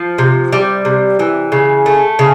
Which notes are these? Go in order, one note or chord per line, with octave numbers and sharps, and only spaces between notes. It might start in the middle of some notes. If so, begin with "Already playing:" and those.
Already playing: F3
C3
G3
C3
E3
C#3
A3
C#3